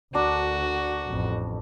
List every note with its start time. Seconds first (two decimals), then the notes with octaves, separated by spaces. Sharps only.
0.15 D2 D4 F#4 A#4 D5
1.08 A1 F2